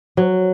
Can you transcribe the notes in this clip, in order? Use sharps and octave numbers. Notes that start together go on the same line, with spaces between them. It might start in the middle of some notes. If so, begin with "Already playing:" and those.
F#3